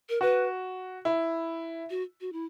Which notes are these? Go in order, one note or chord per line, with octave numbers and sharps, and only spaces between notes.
A#4
F#4 B4
E4
F#4
F#4
E4